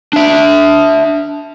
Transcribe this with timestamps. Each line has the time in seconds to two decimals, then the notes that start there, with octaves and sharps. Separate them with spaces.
0.13 D4 E5